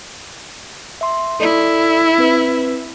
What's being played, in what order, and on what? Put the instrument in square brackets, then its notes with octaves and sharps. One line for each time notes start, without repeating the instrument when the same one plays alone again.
[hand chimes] E5 C6
[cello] E4 [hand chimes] A4 D5
[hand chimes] C4 B4